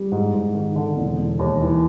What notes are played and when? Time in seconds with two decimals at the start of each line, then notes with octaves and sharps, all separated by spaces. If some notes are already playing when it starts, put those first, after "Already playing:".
Already playing: G3
0.12 G#2
0.33 G#2
0.55 D#3
0.76 D3
0.97 E1
1.19 E1
1.39 D#2
1.61 E3